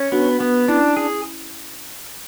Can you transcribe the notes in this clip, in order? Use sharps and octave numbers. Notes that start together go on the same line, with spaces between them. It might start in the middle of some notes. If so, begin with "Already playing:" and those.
Already playing: C#4
B3 D4 F#4
B3
C#4 D4 E4
G#4